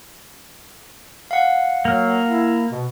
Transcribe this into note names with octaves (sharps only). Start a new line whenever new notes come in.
F5 F#5
F#3 A#3 F6
E4
B2